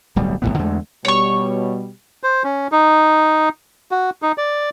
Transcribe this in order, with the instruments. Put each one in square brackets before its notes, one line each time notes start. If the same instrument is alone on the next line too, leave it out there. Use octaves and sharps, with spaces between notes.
[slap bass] D1 B1 G3
F#1 C#2 A2 B3
E2 D3 G#3 A3
[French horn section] B2 G3 [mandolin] C#5 C#6
[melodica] C5
C#4
D#4
F#4
D#4
D5